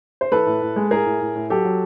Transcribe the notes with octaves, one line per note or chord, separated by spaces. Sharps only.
C5
E3 A4 B4
A2
A2
G#3
A2 G#4 A#4
A2
A2
A2
F#3 G4 A4
F#3